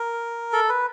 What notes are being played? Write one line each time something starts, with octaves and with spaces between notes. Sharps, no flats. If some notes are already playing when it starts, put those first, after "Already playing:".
Already playing: A#4
A4
B4